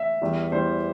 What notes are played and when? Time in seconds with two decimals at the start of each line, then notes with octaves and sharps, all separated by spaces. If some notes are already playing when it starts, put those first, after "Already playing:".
Already playing: E5
0.21 E2 E3 G3
0.52 E2 E3 G3 C5